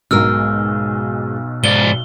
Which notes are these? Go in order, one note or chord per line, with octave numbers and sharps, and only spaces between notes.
B1 G#2 B2 G#3 A#4 E6 F6
G#2 D5 G7